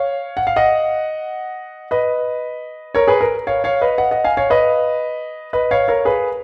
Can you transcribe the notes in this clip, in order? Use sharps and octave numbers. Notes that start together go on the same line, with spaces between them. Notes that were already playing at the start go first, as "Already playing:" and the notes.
Already playing: C#5 F5
F#5
F5
D#5 F#5
B4 D#5
A#4 C#5
G#4 B4
A#4
C#5 F5
C#5 F5
B4 D#5
D#5 F#5
D#5 F#5
F5 G#5
C#5 F5
B4 D#5
B4 D#5
C#5 F5
A#4 C#5
G#4 B4